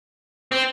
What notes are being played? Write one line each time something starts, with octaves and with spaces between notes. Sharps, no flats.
C4